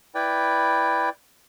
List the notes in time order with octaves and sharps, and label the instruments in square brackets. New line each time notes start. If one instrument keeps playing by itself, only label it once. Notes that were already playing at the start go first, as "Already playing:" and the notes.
[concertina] E4 B4 D5 G5